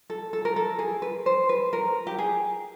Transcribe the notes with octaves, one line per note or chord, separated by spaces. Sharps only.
A4
A4
A#4
A4
G#4
B4
C5
B4
A#4
G4
G#4